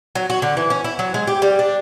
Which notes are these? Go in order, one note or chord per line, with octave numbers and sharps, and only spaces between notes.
F#3
F#4
D3
E3
C#4
E4
F#3
G#3
G4
G3
D4